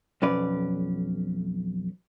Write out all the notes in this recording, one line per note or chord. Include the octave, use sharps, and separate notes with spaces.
B1 F2 C#4 B4 D5